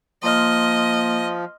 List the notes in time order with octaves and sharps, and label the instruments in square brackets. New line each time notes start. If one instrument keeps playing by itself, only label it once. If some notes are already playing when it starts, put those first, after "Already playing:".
[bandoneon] F3 [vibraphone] A#3 [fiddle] D#5 [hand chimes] C6 D#6 F6